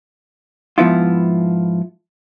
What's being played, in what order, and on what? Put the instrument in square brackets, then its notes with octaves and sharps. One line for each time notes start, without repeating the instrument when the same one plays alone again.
[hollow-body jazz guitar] G#2 F3 B3 E4 F4